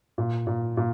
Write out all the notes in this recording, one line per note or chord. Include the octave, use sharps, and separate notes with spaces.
A#2
A#2
A#2